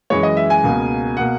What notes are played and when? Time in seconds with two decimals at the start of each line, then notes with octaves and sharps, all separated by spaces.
0.10 F#2 E3 G#3 C#5
0.23 D#5
0.37 E5
0.50 G#5
0.64 C#2 B2 A#3
1.17 B2 A#3 F#5